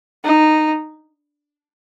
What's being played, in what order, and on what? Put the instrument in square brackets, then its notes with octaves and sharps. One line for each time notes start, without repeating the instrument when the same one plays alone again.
[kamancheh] D#4